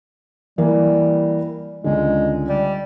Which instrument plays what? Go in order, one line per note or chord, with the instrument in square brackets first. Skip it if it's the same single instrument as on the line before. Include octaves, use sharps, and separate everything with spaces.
[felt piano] E3 A#3 [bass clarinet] G3
[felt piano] C#2 D3 [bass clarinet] G#3
[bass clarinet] G3